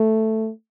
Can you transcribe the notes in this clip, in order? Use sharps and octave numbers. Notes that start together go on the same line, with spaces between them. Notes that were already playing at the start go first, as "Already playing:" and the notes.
Already playing: A3